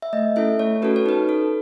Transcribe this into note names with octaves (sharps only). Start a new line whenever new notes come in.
E5
A3 D#5
C#4 E4 A4 E5
A3 C#5
C#4 F#4 A4 B4
C#5
D#4 B4
A4